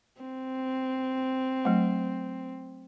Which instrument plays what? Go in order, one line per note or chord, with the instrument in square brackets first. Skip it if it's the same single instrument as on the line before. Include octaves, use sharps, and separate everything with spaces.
[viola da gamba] C4
[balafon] F#3 A3